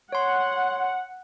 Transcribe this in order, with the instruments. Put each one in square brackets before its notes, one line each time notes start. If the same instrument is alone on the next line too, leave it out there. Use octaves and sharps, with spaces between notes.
[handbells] C#5 C6 [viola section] F#5